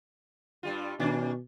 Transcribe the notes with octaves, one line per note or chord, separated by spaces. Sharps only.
G2 G3 F4
B2 D#3 C#4 D4